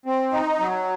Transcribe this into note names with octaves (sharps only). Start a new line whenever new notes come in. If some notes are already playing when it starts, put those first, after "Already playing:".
C4
D#4
F#3